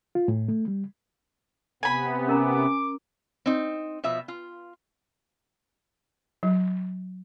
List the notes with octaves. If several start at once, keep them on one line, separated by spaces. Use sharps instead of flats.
F4
A2
A3
G3
C3 B3 G#5 B5
C#4 A#4 A#5 D6
C4 D#4
B2 F3 E5
F4
F#3